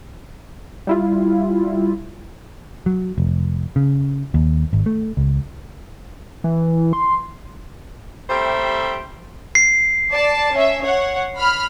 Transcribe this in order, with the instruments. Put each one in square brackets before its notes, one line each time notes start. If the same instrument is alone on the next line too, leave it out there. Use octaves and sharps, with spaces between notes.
[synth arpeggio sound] G3 E4 F4
[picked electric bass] F#3
F1
C#3
D#2
G#1
A3
C#2
[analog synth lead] E3
C6
[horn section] C3 G3 A3 C5 E5 G5
[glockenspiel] C7
[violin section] D5 A5
C#4 E5
C#5 F#5
B5 F6